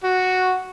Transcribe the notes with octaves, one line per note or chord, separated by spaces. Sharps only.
F#4